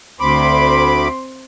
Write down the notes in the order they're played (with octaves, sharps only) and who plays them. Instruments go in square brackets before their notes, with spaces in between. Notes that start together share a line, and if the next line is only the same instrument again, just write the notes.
[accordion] D2 B5 D6 [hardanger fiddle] C4 C6